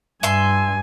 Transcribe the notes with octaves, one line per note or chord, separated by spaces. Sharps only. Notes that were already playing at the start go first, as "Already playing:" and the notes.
G2 E5 G#5 C6